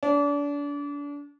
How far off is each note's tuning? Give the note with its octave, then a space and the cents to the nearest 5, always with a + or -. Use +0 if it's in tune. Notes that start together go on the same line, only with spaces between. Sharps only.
D4 -35